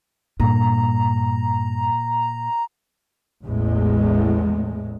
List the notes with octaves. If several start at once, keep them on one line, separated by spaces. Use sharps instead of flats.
G2 A#2 A#5
A1 E2 A2 G#3